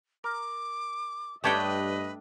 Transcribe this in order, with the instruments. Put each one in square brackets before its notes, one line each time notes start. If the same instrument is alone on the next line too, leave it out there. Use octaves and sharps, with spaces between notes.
[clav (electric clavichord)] A#4 [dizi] D6
[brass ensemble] G2 D#5 [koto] A3 D4 G5 [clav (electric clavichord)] G4 C#5 [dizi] B4